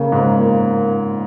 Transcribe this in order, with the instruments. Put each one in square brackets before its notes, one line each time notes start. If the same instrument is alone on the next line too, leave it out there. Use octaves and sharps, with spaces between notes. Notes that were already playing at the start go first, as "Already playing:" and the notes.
Already playing: [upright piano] C#3 [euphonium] A#3
[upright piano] G#2
[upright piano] A#2 [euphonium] A#3